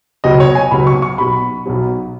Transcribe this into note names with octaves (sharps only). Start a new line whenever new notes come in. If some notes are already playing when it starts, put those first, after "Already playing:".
C#2 B2 F#3 D#5
C#5
G#5
C#2 B2 F#3 B5
C#6
C#6
B1 B2 F#3 B5
B1 B2 F#3